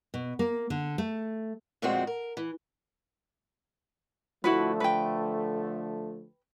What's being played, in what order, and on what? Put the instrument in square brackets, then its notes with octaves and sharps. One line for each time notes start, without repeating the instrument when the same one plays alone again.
[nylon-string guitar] B2
A#3
D3
A3
[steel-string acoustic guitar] F2 A#2 G#3 A3 C4 F#4
A#4
E3
[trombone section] D3 F3 A3 [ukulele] E4 F#4 B4
[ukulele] B4 G5